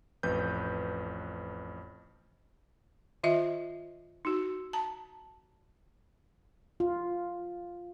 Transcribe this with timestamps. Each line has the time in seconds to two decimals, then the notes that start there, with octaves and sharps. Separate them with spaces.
0.23 A1 F2 B4 G6
3.23 D#3 F4 D#5 E5
4.25 D#4 F#4
4.73 A5 A#5
6.80 F4